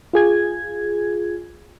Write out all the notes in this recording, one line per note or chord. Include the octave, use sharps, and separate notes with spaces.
F4 G#4 G#6